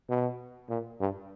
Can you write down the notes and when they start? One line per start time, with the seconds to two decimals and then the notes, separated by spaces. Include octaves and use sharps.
0.09 B2
0.69 A#2
1.00 G2